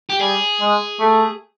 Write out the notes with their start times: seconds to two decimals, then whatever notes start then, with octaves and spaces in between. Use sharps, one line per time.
0.10 G4
0.21 G3 G#4
0.61 G#3
1.00 A3